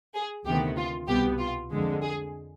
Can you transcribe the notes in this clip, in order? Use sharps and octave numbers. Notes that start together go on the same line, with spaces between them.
G#4
D2 C3 D#3 B3 G4
F4
C2 B2 B3 G4
F4
F2 D3 G#3
G#4